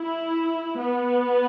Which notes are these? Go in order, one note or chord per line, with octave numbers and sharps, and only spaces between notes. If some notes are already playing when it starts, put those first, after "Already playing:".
Already playing: E4
B3